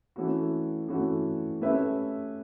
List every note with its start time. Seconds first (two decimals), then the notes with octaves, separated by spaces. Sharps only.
0.16 E3 A3 C#4 F#4
0.88 E3 A3 C#4 F#4
1.61 A3 C#4 G4 B4 E5